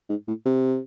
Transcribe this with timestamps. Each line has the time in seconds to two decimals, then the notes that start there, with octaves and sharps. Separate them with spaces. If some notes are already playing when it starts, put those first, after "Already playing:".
0.10 G#2
0.28 A2
0.46 C3